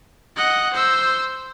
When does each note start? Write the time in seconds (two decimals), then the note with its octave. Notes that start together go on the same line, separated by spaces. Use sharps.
0.37 D#5 F#5
0.74 C5 E6